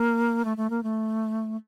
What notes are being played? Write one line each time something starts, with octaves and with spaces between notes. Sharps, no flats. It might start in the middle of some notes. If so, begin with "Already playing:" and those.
Already playing: A#3
A3
A3
A#3
A3